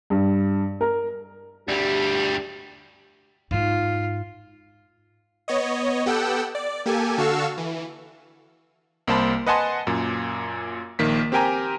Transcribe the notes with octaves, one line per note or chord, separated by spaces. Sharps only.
G2
A#4
D2 G3 G4
G#2 D#4 F4
B3 C#5 D#5
B3 G4 A4 F#5 G5 E6
D5
A#3 G4 A4 G#5
D3 F#4 A4 F5 C#6 E6
E3
C2 A#3 C5 A5 B5
B4 D#5 F#5 G#5 A5 C6
F#2 A#2
A#1 D#3 A#3 B6
C4 G4 A#4 G5 G#5 A#5